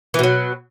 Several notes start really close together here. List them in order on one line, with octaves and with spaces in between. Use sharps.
E3 B2 F#3